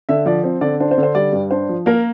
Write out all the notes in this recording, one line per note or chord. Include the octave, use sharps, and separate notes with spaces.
D3 E5
F3 D5
C4
D3 D5
D4 C5
C5
D3
C5
G3 D5
G2
D4 C5
F3
A#3 A#4